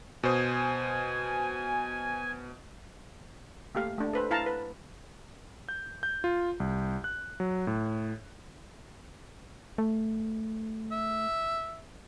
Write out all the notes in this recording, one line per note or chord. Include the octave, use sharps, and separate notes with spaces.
B2 C5 G#5 D#6
A3 A#3 G4 F5
A3 D4
A4 B4 C5
E4 F5 A5 A#5
B4
G6
G6
F4
C2
F#6
F#3
A2
A3
E5